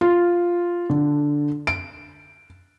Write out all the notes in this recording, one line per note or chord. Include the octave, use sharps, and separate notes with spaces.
F4
D3
D7